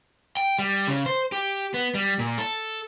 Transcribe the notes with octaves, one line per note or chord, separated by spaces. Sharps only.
G5
G3
C#3
C5
G4
B3
G3
A#2
A4